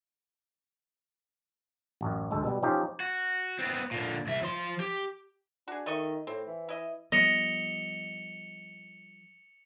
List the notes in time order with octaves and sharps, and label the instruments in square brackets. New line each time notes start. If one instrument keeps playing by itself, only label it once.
[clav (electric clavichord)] A1 F#2
D2 G#3 A4
B2 G3
F3 C4 C#4 D#4 G4
[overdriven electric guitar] F#4
B3 C4
A#2 D3
C2 E5
F3 C6
G4
[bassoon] D4 [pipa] F#4 G#4
[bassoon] D#3 [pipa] A3 D#5 C#6
[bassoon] A2 [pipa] C4
[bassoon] E3
[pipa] E4 D#5
[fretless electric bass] F3 G3 B3 [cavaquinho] D#5 [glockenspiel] C#7 F7 G7